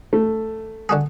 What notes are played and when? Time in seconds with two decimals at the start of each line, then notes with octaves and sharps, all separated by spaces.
0.13 A3
0.89 D3 F#4 G#4